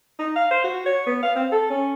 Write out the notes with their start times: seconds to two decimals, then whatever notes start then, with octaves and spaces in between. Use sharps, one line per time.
0.19 D#4
0.35 F5
0.51 C5
0.64 F#4
0.85 C#5
1.07 B3
1.23 F5
1.36 C4
1.52 A4
1.70 C#4